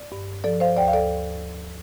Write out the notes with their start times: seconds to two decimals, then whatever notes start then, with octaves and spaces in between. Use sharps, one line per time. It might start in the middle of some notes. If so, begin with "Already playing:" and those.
Already playing: D5
0.12 G2
0.44 F3 A4 D5
0.60 C5 F5
0.77 D2 D5 G5
0.88 F5
0.93 A4 D5